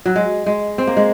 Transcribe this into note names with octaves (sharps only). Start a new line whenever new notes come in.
F#3
G#3
G#3
C4
A#3
G#3